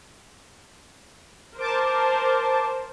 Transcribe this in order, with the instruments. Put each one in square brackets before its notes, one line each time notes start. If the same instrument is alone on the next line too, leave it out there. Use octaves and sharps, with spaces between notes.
[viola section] A#4 C5 [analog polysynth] A5 D6